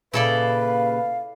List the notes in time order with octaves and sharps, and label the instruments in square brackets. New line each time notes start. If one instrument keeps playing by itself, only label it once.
[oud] A#2 C#3 [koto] E4 A4 D5 [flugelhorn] B4 [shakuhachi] F5